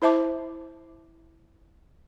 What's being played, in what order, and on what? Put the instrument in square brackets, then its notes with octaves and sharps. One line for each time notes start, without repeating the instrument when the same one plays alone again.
[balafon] E4 C5 E5 A5 D6